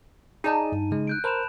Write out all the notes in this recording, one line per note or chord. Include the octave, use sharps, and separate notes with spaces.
D#4 G#4 D5 D#5 G#5 A5 D#7
G2
C#3 G#3
F#6 G6 D7
A#4 C5 A5 B5 E7